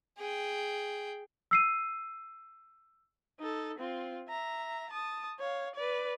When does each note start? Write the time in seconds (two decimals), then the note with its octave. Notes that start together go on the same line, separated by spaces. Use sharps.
0.18 G#4 G5
1.51 E6 C7 D#7
3.40 D#4 A4
3.78 C4 F4
4.28 E5 A#5
4.90 A5 D#6
5.39 C#5 F5
5.75 B4 D5